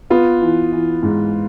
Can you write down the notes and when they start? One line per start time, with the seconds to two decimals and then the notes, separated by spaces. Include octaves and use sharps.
0.10 B3 F4
0.41 E3
0.72 E3
1.03 G#2